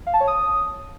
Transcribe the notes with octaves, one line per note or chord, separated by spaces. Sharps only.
F5
A5
C#5
D#6